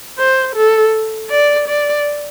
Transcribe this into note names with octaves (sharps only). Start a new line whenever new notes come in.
C5
A4
D5
D5